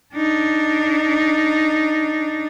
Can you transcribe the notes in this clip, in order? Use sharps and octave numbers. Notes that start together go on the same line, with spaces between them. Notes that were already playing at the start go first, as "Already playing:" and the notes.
D4 D#4